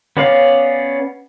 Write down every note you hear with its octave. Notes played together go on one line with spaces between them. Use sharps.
B3 C#4 D5 F5